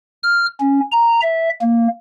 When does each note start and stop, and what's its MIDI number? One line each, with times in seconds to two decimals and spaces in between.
0.23 0.46 89
0.60 0.80 61
0.92 1.20 82
1.22 1.50 76
1.61 1.87 58